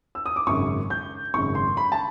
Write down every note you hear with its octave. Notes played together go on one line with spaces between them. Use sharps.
E6
D#6
D6
G#1 F#2 C#3 C#6
G6
G#1 F#2 C#3 C#6
C6
B5
A5